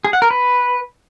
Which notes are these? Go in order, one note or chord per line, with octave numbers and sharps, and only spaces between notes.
G#4
F#5
A#4
B4